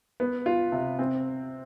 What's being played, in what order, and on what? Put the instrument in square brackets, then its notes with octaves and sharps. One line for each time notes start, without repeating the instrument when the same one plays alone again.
[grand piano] B3
F4
C3
C4